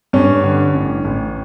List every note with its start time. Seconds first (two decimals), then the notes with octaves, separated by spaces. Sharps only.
0.13 G2 C#4
0.43 D3
0.74 A1
1.05 A1